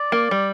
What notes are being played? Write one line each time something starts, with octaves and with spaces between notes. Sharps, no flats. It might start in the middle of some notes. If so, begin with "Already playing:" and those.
Already playing: D5
A#3
G3